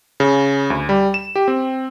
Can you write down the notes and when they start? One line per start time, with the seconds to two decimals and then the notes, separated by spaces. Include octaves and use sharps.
0.20 C#3
0.70 D2
0.89 G3
1.14 E7
1.36 G4
1.48 C4